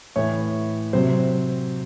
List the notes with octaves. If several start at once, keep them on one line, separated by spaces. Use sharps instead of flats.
A2 E3 C#5
C3 F#3 C5